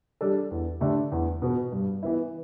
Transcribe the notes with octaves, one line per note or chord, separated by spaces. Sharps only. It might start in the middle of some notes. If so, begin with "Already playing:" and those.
G3 D4 A4
E2
D3 A3 D4 G4
E2
B2 B3
G2
E3 B3 E4